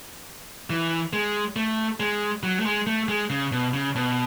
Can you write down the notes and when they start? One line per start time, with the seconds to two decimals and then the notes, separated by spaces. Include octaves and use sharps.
0.70 E3
1.13 G#3
1.56 A3
2.00 G#3
2.43 F#3
2.60 A3
2.65 G#3
2.87 A3
3.08 G#3
3.30 C#3
3.52 B2
3.74 C#3
3.96 B2